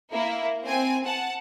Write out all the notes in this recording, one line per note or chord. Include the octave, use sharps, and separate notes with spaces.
A#3 E4
C4 G#5
F#5 A5